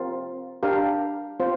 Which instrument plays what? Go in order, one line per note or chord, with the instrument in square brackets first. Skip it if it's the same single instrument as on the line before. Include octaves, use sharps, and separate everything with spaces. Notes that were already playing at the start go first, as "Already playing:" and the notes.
Already playing: [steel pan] C4 F4 A#4
D4 G4 A#4 F5
C4 F4 C5